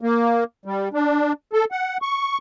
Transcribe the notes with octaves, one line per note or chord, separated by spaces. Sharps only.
A#3
G3
D4
A4
F#5
C#6